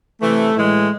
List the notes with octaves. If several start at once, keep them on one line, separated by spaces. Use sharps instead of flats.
C3 E3 A3
A2 E3 G#3